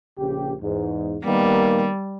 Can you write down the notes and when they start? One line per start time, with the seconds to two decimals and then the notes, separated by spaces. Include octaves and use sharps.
0.18 A#1 C#3 G4
0.62 E2 G#2
1.24 D#3 G3 A#3 B3